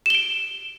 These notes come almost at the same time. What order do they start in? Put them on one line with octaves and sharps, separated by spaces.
E7 G7 D7